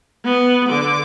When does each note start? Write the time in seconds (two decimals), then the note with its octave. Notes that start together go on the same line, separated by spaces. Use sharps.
0.24 B3
0.69 D3 D6